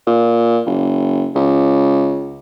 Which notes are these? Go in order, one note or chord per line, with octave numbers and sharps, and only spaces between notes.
A#2
F#1
C#2